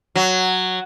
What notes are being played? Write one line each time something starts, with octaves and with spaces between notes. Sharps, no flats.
F#3